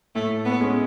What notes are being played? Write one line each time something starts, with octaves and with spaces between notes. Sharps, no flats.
A2 A3
B3
G#3 C#4